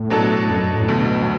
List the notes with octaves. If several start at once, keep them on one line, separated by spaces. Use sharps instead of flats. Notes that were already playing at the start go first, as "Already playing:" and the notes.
Already playing: A2
B2 F#3 D4 A4
A2
F#2
F#2
A2
D2 B2 D3 A3
F#3